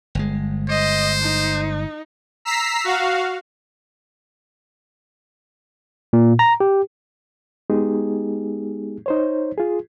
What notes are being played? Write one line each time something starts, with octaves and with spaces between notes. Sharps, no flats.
G1 G#3
C5 D#5
D#4
A#5 E6 B6 C7
F#4 F5
A#2
A#5
G4
G#3 B3 D#4 G4 G#4
D#4 C5 C#5
F4 G#4